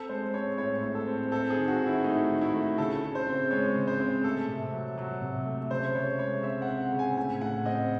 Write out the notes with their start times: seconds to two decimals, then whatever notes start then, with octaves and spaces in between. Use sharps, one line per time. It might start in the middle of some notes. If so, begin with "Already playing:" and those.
Already playing: C4 A4
0.09 G#3 C5
0.34 C4 C#5
0.58 A2 C#5
0.83 A2
0.95 A4
1.07 C4
1.32 C4 A4
1.50 G#4
1.56 D#3
1.68 F#4
1.81 D#3
1.86 E4
2.04 A3 D#4
2.30 D#3
2.41 E4
2.54 A3
2.78 C#3 A4
3.03 C#3
3.15 C5
3.27 C4
3.51 G#3 C#5
3.76 C#3
3.87 C5
4.00 C4
4.24 A3 A4
4.48 C3
4.73 F#3
4.98 F#3
5.22 C3
5.46 A3
5.70 C#3 C5
5.94 C#3 C#5
6.19 G#3 C#5
6.43 C4 E5
6.62 F#5
6.68 C4
6.81 F#5
6.92 C#3
6.99 G#5
7.17 A2 G#5
7.41 A2 F#5
7.65 C4 D#5